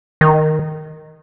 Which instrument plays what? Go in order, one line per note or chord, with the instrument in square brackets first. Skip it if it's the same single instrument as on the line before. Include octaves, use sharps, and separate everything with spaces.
[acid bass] D#3